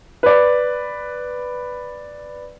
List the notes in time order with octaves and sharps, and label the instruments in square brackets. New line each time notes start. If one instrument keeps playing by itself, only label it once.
[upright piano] B4 D5